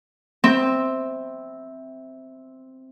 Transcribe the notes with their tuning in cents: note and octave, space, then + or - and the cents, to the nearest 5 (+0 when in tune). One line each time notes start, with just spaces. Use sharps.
C4 +0 E5 -10